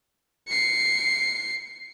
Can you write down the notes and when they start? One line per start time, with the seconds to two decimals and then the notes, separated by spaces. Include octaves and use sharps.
0.48 C7 C#7